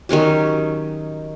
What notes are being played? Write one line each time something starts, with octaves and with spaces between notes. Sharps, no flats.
D#3 F#3 C#4 G4